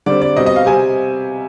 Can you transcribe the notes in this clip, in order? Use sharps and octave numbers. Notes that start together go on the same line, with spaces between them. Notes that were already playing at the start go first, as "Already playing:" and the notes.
D3 G3 C4 D5
D5
B2 G3 C4 D#5
D#5
F5
C3 G3 C4 G#5